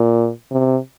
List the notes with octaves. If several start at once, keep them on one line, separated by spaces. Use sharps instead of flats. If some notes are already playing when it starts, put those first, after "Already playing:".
Already playing: A#2
C3